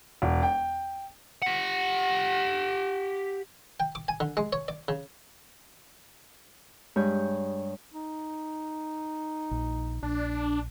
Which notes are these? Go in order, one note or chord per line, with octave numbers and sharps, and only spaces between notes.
E1
G5
G4 F#5
G5
D6
G#5
D3
G#3
C#5
D5
C#3
G2 G#3 C#5 B5 D#6 G6
D#4
A#1
A#1 D4